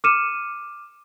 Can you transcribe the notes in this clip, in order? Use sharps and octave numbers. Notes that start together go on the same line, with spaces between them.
D6 F6 C#7 D#7 E7